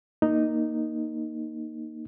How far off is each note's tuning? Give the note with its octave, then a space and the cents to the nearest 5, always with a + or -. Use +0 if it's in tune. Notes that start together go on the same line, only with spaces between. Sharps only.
A#3 +0 D#4 -5